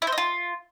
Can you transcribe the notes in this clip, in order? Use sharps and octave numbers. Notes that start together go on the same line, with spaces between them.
E4
C5
D#5
F4